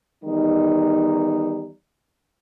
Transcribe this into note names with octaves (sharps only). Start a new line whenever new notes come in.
E2 D#3 G3 D#4